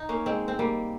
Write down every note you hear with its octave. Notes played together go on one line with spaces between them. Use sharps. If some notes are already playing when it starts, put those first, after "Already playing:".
Already playing: D#4
A#3 C#4
G#3 C4
C4
G3 A#3